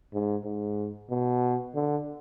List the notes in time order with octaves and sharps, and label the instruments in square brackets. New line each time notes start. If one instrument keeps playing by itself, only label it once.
[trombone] G#2
G#2
B2
D3